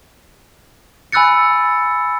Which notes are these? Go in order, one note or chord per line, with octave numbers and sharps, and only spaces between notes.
G#5 B5 E6 F#6 A6 C#7